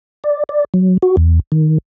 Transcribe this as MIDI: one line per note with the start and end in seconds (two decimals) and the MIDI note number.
0.24 0.44 74
0.49 0.64 74
0.74 0.98 54
1.02 1.16 66
1.17 1.39 40
1.52 1.78 51